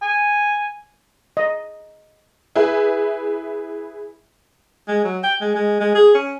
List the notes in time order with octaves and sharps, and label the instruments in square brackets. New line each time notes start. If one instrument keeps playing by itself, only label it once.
[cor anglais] G#5
[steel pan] D#5
[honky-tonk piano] E4 G#4 B4 E5
[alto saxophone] G#3
F#3
G5
G#3
G#3
G#3
G#4
C#4